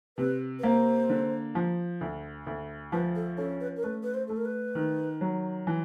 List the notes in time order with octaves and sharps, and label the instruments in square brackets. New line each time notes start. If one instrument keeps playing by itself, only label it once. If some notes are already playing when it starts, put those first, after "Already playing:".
[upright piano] C3 [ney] B4
[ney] B4
[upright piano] A#3 [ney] C5
[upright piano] D3
F3
D2
D2
[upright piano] F3 [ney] B4
[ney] A4
[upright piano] C#4 [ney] A4
[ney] B4
A#4
[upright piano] A3 [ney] B4
[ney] B4
C5
[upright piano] A3 [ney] A4
[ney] A#4
B4
[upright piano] D#3
F#3
E3